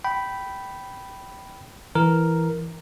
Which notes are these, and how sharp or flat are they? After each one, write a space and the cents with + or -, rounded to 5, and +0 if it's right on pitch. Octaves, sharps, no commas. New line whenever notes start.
G5 -15 B5 +0
E3 +0 A#4 +0